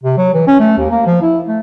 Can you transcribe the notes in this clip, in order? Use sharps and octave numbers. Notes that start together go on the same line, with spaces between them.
C3
F#3
E3
C#4
A3
D#2
A#3
F3
E4
A3